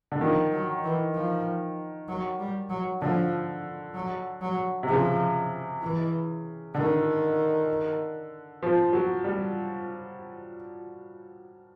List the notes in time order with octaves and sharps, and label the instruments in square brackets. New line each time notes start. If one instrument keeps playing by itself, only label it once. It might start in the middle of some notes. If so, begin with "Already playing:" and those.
[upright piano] D3
[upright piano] D#3 [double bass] F3
[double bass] F#3
E3
F3
F#3
G3
F#3
[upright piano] D3 [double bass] F3
[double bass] F#3
F#3
[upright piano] C3
[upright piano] C#3 [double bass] F3
[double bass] E3
[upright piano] D3 [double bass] D#3
[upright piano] F3
F#3
G3